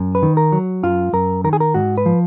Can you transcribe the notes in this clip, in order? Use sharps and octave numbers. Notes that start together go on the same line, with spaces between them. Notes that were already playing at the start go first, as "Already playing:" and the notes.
Already playing: F#2
B4
D#3
A#4
F#3
F#2 F4
F#2 A#4
D#3 A#4
G#4
A#4
G#2 F#4
B4
F3